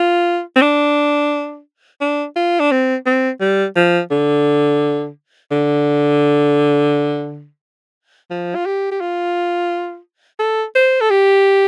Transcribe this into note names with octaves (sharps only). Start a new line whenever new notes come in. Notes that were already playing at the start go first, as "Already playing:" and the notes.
Already playing: F4
C4
D4
D4
F4
D4
C4
C4
G3
F3
D3
D3
F3
F4
G4
G4
F4
A4
C5
A4
G4